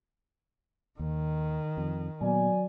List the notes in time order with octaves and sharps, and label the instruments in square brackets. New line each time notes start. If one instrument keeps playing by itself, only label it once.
[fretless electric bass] D#2 [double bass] D#3
[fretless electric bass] F2
[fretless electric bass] A#2 B3 [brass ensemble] F#3 D5 G#5